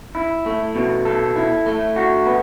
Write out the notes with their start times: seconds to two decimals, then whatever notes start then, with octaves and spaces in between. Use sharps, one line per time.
0.15 E4
0.46 A3
0.75 B2
1.05 A4
1.36 E4
1.66 A3
1.96 F#4
2.26 B3